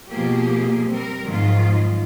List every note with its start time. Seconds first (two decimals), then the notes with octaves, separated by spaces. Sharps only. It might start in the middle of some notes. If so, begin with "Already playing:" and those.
0.11 B2 F3 A#3 G4 G#4
0.91 G3 C4 A#4
1.26 F2 G#2 D#3 F#3 F4